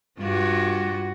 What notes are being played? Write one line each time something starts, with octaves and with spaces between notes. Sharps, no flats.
G2 F4 F#4